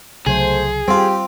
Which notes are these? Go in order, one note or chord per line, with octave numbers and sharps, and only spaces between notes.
C2 C#3 F#3 A3 G#4 C5
G3 C4 F4 G4